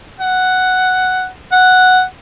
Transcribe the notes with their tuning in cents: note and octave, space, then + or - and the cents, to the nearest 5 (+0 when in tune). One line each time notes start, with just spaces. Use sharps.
F#5 +5
F#5 +0